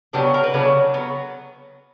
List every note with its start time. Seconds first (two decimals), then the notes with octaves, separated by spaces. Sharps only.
0.13 C#3 F#3 B3 D4 G4
0.34 A#4
0.44 B4
0.54 C#3 F#3 B3 D4
0.94 F#3 B3